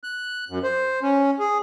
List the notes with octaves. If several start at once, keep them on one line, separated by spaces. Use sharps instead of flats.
F#6
F#2
C5
C#4
G#4